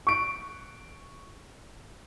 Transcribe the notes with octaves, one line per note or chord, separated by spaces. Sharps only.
C#6 D7